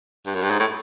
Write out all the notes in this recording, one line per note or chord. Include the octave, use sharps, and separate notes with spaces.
G2
F#2
G2
G#2
A2